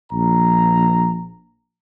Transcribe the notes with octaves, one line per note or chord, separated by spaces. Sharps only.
A#1 A#5